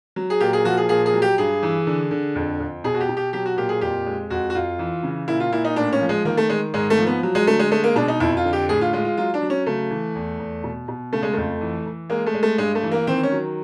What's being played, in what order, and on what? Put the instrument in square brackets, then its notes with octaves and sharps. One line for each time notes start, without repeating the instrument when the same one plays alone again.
[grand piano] F#3
G#4
A#2 G4
G#4
F3 F#4
G#4
A#2 G#4
G#4
F#3
G4
G2 G#4
E3
D3
D3
F2
F2
B2 G#4
F#4
G4
B2
G4
F#3 G4
F#4
A#2 G4
G#4
F2 G4
G#3
F2 F#4
F#4
F2 F4
E3
C#3
A#2 E4
F4
A#2 E4
D#4
A2 D4
C#4
F3
G#3
D#3 A#3
A3
D#3 G#3
G#2 G#3
A3
F3
B3
F#3
G#3
D3 A3
G#3
G#3 A3
A#3
B2 D4
D#4
F2 E4
F4
D3
G4
A2 G#4
F4
G#3 F4
F4
F#3 F4
D4
F#3
C#4
C#3 A3
E3
E2
E2
B2
B2
C#3 A3
G#3
F2 A3
E3
E3
G#3 A#3
A3
G#3
A3
G2 G#3
A3
E3
A#3
D#3 C4
C#4
F#3